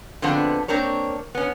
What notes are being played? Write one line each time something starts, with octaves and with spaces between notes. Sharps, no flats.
D3 F3 G#3 B3 C4 D4
A#3 C4 D4 A#4 C#5
B3 C#4